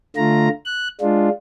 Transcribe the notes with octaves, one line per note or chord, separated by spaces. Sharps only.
D3 A3 F4 A#5
F#6
G#3 D4 F4